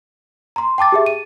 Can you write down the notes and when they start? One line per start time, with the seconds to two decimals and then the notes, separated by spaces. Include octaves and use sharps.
0.56 A#5 C6
0.78 G5 A5 D6 A6
0.92 G4 G#4 E5
1.06 D#7